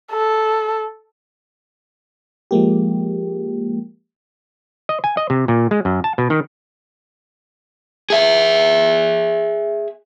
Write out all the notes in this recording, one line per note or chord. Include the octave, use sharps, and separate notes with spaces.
A4
F3 G#3 A#3 G4
D#5
G#5
D#5
C3
A#2
G#3
F#2
A5
B2
D#3
G#4 E5